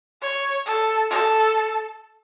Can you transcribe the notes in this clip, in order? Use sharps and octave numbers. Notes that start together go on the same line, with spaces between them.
C#5
A4
A4